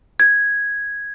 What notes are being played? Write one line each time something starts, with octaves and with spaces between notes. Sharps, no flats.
G#6